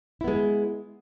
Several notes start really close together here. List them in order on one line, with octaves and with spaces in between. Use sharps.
E4 B3 G#3